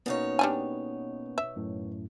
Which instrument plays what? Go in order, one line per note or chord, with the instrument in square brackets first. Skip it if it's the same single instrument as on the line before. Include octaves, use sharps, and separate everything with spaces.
[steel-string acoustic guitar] B2 D#4 C#5 [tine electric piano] A#3 B3 C#4
[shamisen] G3 D4 G#5
E5
[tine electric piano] F#2 A2